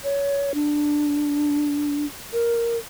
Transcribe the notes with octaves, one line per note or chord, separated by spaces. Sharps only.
C#5
D4
A#4